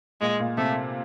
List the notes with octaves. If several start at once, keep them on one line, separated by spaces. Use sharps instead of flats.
A#2 G#3
A#2
C3 A3